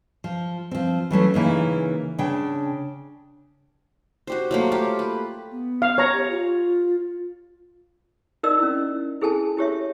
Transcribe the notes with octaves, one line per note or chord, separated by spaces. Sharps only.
F3
F3 C4
E3 F#3 A3 C#4
C#3 E3 A#3 D#4
C#3 D4 G5
F#4 G4 C5
F#3 A3 A#3
F4 G4
B4
B3
F5
C#5 A#5
G4
F4
D#4 A#4 D5 D#5 E6
C#4 E4
E4 G#4 A4 G#5 A5
E4 G4 C#5 E5